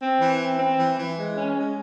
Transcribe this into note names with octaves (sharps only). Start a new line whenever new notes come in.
C4
E3
C4
C4
E3
E3
G#3
C#4
G#3